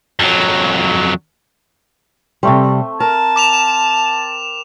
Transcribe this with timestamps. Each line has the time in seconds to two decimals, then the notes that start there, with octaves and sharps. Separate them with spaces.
0.20 F2 F#3
2.43 C3 G3 A3 C4
3.00 A#4 A5 A#5
3.36 D6 E7 F7